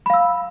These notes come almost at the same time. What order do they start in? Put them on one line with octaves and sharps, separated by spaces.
B5 F5 E6